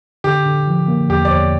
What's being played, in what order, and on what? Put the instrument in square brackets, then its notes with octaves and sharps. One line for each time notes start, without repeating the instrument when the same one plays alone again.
[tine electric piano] D3 [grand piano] G4
[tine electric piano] D3
F3
A#3
[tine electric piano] E2 [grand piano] G4
[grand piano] D5
[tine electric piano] E2 [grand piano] C#5